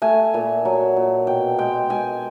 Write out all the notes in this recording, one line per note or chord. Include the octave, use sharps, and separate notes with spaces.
A3 G#5
A#2
F#3
A#2
B2 G5
G#3 G5
G#3 G#5